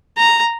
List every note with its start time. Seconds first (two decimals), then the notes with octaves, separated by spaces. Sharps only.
0.17 A#5